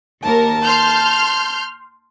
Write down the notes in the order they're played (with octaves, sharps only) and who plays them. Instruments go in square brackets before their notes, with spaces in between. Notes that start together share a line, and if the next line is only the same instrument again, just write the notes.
[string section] D#2 A#4 [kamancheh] A5
[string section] C6 F6 G6